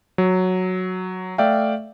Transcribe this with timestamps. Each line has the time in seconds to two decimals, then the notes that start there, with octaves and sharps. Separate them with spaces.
0.18 F#3
1.38 A3 D5 E5 F5 G5